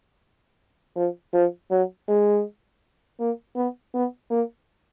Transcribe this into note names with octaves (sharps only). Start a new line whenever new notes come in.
F3
F3
F#3
G#3
A#3
B3
B3
A#3